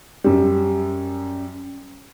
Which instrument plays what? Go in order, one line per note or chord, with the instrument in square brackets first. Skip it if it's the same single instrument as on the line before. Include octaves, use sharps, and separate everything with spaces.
[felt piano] F#2 G3